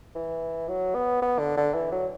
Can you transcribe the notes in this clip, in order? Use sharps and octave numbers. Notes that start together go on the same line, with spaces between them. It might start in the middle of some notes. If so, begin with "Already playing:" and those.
E3
F#3
B3
B3
D3
D3
E3
F#3